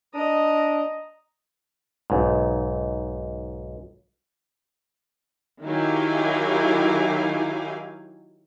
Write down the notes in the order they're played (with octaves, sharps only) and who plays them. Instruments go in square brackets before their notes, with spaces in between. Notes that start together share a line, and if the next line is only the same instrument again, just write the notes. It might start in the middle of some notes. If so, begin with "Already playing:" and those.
[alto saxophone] D4 [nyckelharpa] D#5 A#5
[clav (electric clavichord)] B1 G#2
[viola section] D#3 F#3 E4 G4 F5 G#5